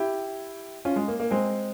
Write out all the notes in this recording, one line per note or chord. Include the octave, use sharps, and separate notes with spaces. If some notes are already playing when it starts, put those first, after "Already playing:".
Already playing: E4 G4
C#4 F4
G#3
A#3
A#3
G#3 C4